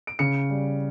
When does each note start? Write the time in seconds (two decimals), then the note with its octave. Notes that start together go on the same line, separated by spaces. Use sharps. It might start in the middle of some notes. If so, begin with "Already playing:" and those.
0.07 D7
0.19 C#3 C#7
0.50 G3